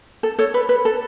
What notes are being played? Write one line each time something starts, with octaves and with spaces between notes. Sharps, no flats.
A4
A4 C#5
B4
B4
A4